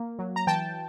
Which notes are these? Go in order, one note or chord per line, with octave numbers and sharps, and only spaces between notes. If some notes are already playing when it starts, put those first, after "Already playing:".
Already playing: A#3
F#3
A#5
E3 G5 A5